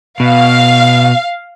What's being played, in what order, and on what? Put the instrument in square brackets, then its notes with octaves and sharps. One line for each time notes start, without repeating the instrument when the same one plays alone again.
[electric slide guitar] B2 [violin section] F5